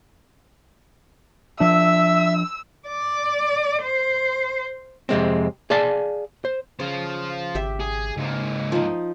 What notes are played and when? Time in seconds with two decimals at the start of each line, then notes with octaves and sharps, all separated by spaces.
1.60 F3 D4 E5 E6
2.88 D5
3.82 C5
5.09 F2 C3 G#3 C4
5.70 G#4 D5 F5 A5
6.45 C5
6.80 C#3 F4 C5
7.55 G#1 G4 E5
7.80 G#4
8.17 G#2 C#3 A#3
8.72 F3 D#4